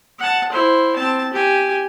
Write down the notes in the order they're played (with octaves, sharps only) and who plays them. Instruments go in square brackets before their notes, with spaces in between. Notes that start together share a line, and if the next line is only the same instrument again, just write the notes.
[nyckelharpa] F#5 A5
E4 C5
C4 A5
G4 G#5